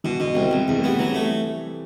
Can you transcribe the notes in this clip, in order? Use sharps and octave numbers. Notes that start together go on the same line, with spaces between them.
B2 E3
B2 D3
C2 C3
C2 C3
E2 C3
A3
G3 B3
E3 F#3
C3 A3